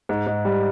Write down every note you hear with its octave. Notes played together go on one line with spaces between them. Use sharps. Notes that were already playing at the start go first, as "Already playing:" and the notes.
G#2
G#2
G3